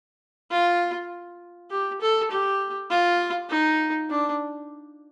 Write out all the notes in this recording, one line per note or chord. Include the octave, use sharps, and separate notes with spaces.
F4
G4
A4
G4
F4
D#4
D4